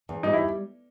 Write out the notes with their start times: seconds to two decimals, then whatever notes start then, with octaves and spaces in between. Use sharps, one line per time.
0.09 E2
0.23 G3 D#4
0.33 E4